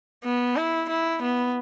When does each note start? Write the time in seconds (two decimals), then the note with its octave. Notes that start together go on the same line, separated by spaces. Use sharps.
0.24 B3
0.56 E4
0.89 E4
1.22 B3